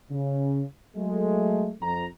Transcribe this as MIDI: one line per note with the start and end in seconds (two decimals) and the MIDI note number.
0.11 0.62 49
0.96 1.71 54
0.96 1.71 56
0.96 1.71 57
1.82 2.06 41
1.82 2.06 82